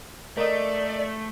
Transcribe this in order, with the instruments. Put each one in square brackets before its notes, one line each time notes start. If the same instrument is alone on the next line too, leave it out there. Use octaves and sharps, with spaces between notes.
[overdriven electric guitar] A3 [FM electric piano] A#4 D#5 [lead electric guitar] D5